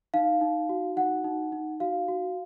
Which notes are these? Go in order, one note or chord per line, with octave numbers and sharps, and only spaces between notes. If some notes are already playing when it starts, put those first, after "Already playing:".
D#4 F5
D#4
F#4
D#4 F#5
D#4
D#4
F#4 F5
F#4